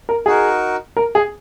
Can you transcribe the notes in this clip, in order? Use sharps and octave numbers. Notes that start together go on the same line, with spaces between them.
A#4
D#4 F#4 G#4 A#4
A#4
G#4